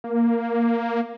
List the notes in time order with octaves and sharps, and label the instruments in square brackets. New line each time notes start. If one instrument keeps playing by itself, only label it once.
[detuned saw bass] A#3